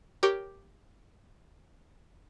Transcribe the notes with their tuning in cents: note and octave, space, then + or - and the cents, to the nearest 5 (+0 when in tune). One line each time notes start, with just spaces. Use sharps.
G4 +0 A#4 +0 C#5 +0